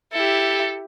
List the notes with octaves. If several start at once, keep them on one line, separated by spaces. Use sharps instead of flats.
E4 G4 A4